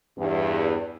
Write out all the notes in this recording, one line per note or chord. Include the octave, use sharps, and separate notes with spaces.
E2 G2